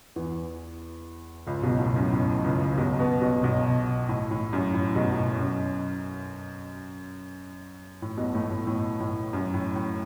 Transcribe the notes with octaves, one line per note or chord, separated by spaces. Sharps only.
E2 E3
C#2 C#3
B1 B2
A2
F#2
A2
C#2 C#3
B1 B2
B2 B3
B1 B2
B1 B2
A2
A2
F#2
A2
B1 B2
A2
F#2
A2
B1 B2
A2 A3
A2
A2
A2
F#2
A2
A2